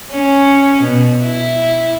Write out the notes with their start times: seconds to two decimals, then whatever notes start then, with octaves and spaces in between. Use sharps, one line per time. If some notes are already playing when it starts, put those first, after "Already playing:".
0.12 C#4
0.82 B2
1.23 E4